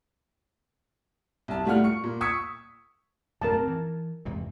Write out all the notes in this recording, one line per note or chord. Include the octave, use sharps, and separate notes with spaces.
C2 A5
A2 G3 A3 F4 F#5 F6
C#6 C#7
A#2
C#6 D#6 E6 G#6 B6 C#7
F#2 A2 C3 A#4 A5
C4
E3
E2 G#2 C3